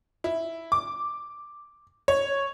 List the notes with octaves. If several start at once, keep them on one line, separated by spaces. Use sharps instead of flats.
E4
D6
C#5